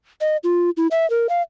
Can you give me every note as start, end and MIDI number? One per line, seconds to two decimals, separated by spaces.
0.21 0.37 75
0.44 0.70 65
0.77 0.87 64
0.91 1.08 76
1.10 1.27 70
1.29 1.42 77